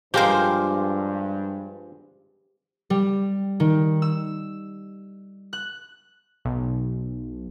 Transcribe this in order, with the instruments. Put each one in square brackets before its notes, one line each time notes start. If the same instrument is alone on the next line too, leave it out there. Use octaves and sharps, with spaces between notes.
[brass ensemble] G2 [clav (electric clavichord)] F3 G#3 F4 [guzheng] G4 A#4 C5
[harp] G3
D#3
E6
F#6
[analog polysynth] B1